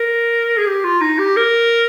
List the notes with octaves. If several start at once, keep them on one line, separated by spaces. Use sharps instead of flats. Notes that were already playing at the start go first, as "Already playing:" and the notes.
Already playing: A#4
G#4
G4
F4
D#4
G4
A#4